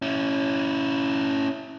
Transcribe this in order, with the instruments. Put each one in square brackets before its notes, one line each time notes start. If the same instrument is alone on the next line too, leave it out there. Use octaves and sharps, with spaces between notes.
[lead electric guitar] C#4 E4